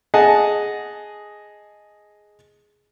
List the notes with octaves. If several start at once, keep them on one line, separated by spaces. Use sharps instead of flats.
G#4 D#5 F#5 A5